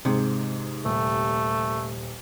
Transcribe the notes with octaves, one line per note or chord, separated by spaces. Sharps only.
G#2 C3 G#4
D#1 A3 G4